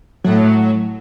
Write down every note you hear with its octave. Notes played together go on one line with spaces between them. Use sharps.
A2 F#3 A3